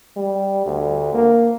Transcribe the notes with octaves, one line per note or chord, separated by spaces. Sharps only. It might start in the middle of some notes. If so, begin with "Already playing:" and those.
G3
D2
A#3